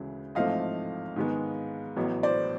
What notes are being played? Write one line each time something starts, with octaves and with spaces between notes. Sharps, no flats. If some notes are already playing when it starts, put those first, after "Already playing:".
Already playing: D2 C#3 E3 G#3
A1 G#2 F3 A3 C4 D#5 F5
G#2 D#3 G#3 B3
A1 A2 F#3 B3
C5 D5